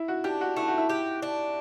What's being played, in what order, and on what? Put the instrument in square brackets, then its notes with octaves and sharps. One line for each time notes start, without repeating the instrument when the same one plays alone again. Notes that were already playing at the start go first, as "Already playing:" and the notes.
Already playing: [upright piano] E4
F#4
[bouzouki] D4 [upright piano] G4
[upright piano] F#4
[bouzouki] A3 [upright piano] E4
[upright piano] F#4
E4
[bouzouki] G4
D4